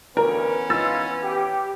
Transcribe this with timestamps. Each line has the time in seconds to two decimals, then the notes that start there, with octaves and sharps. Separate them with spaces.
0.17 D2 E3 B3 C#4 A#4
0.70 G#3 D#4 F4 E6 A6
1.23 G4